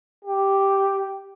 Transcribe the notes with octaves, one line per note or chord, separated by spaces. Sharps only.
G4